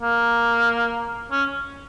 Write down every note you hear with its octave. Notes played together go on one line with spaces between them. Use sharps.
A#3
C#4